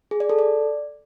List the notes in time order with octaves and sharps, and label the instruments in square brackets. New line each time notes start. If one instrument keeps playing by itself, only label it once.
[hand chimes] G#4
D5
A4
D5